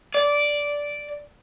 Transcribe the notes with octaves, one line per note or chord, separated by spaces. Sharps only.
D5